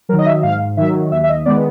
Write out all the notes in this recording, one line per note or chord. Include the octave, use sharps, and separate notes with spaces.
D#3 F#3 A#4
D#5
E5
G#2 F5
D#3 F#3 E5
D#2 E5
E5
D#5
D#3 G#3 B3 D5